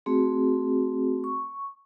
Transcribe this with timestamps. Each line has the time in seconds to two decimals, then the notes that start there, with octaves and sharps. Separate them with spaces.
0.06 A3 C4 F#4 G#4
1.24 C#6